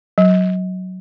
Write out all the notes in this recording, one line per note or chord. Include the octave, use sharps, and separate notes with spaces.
F#3